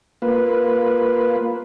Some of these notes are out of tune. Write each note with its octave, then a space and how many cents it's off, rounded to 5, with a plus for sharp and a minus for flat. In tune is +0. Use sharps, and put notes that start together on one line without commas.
A#3 +0 F4 +0 B4 +0